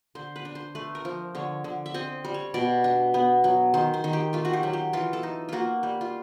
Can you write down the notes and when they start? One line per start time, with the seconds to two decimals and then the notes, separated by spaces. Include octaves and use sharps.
0.15 D3 C5
0.36 B4
0.45 D4
0.55 C5
0.75 A3 B4
0.95 A#4
1.05 F3
1.35 D3 C#5
1.64 D3
1.86 E5
1.94 C4 D#5
2.24 G3
2.34 C#5
2.54 B2 D5
2.84 D4
3.14 B3
3.44 F#3
3.74 D#3 C5
3.94 C5
4.04 D#3
4.13 G4
4.33 A3 F4
4.45 F#4
4.53 G4
4.63 F#3
4.73 G4
4.93 E3 F4
5.13 A4
5.23 D#4
5.49 A#3 F4 F#4
5.83 G3
6.01 F4